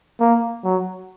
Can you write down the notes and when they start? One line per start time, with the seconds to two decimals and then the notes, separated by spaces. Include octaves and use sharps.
0.20 A#3
0.64 F#3